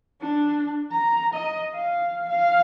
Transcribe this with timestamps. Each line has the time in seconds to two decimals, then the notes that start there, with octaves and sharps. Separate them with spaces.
0.21 D4
0.91 A#5
1.34 D#5
1.75 F5
2.29 F5